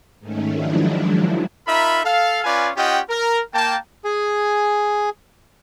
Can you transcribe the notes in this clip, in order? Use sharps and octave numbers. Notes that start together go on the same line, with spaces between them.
G#2 D#3 A3 C#4
D#3 F3 F#3 G#3 D4 E4
D#4 F4 A#4 E5 B5
A4 F5
C#4 F4 B4 D5 F5 G#5
C#4 F4 G4 D#5 F#5 G5
A#4
A#3 G5 A5
G#4 G#5